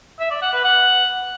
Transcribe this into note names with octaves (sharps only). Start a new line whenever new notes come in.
E5
D5
F#5
B4
F#5